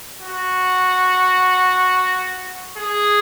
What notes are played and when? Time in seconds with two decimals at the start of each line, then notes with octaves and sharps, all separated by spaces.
0.21 F#4
2.78 G#4